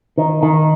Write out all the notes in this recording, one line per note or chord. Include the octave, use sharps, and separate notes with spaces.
D#3
D#3